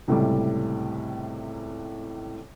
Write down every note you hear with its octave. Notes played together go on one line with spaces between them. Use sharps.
C#2 A2 C3 G3